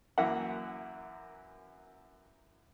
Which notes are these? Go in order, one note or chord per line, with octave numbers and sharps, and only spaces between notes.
F#2 E3 A#3 E5 F#5